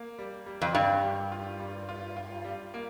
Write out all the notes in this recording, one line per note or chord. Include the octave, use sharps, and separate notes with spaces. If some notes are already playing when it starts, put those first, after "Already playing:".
Already playing: A#3
G3
G3
F2
G2 G3
G3
F4
G3
F4
F4
G3
A#3